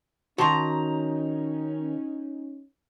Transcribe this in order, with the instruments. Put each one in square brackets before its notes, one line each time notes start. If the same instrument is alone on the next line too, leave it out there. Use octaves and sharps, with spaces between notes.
[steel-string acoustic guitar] D#3 A#5 [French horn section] C#4 D#4 [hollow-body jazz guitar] F#4 A5 C6